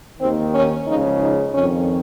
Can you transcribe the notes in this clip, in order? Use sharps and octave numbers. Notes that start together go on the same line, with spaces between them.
D#2 D#3 C4
C#4
C#2 C#3 F3 D#4
D#4
F2 D#3 C#4